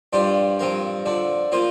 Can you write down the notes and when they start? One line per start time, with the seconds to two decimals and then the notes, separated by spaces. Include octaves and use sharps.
0.13 G2 G3 D4 F4 C5
0.59 G2 F3 C4 A#4
1.06 D3 F3 D4
1.52 F3 A#3 F4 C5